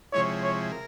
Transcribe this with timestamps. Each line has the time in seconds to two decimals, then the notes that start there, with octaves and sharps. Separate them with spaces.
0.13 C3 F3 G#3 E4 C#5
0.43 C#5
0.72 A#4